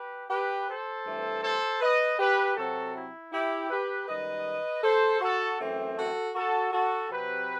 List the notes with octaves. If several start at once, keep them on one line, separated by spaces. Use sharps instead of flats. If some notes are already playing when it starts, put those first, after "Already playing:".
Already playing: G4 B4
G4 B4
A4 C5
G2 E3 A3 C4
A4 C5
B4 D#5
G4 B4
C3 F#3 C4 F#4 A4
E4
E4 G4
G4 B4
F#2 D#3 G3 B4 D#5
A4 C5
F#4 A4
F#2 E3 A3 C4
F#4 A4
F#4 A4
F#4 A4
C3 F#3 C4 G4 B4